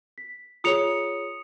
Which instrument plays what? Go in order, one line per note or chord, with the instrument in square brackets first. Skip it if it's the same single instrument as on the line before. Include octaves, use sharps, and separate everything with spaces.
[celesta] B6
[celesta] F4 G#4 C#5 [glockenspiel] D#6 C#7 F7